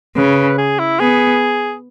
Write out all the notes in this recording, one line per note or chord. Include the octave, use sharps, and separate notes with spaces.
C#3 B4
G#4
E4
B3 G#4